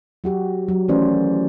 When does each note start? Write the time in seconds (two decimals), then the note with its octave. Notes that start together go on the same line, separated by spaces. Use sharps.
0.24 F#3 F#4 G4
0.68 F#3
0.88 D#3 E3 A3 C#4 C5 D5